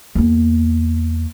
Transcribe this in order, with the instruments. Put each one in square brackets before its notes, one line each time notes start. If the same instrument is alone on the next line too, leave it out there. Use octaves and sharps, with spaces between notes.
[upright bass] E2 A#3